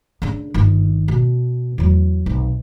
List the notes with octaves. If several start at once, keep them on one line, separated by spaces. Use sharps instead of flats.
C#3 D4
G1 D#3
B2
E2 F#3
B1 C3